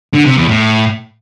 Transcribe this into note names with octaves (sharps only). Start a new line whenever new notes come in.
D3
C3
E2
A2